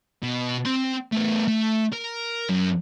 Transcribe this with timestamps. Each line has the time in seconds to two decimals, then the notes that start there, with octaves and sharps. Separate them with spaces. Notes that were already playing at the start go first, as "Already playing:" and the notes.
0.23 B2
0.66 C4 C6
1.12 A3 B3
1.48 A3
1.92 A#4
2.49 F#2